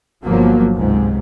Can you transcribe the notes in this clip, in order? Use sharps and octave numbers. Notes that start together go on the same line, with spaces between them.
G1 F3 F#3 A#3
C#2 G#2 C3